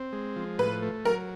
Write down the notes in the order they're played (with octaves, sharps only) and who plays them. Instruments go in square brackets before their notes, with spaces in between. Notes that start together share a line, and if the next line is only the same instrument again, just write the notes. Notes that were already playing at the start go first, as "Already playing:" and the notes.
Already playing: [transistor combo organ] C4
G#3
F3
[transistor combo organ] A2 [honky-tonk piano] B4
[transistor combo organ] A3
[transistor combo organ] F#3 [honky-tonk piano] A#4